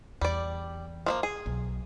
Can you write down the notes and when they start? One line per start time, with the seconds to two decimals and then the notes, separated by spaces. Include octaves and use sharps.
0.21 E2 G3 D5
1.06 F3 A3 A#3
1.23 G#4
1.46 B1